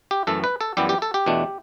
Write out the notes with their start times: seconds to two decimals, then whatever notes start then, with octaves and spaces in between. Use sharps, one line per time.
0.11 G4
0.27 F#2 E3 A3 A4
0.44 B4
0.61 A4
0.77 F#2 E3 G3 B3 E4 G4
0.89 G4
1.02 A4
1.14 G4
1.26 E2 B2 A3 D4